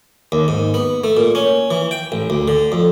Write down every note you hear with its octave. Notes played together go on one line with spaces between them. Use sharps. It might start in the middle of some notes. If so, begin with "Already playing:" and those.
D#2
G#2
B3
A3
A#2
C#4
E3
G5
A1
D2
D3
F2